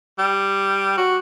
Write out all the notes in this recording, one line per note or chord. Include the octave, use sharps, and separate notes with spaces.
G3
F#4